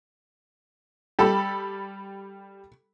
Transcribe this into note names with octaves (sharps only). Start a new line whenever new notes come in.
G3 G4 A4 B5 A6